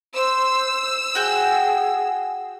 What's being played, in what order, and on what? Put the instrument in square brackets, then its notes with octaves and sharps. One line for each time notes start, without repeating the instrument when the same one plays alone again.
[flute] C5 [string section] E6
[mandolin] F#4 G5 [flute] G#4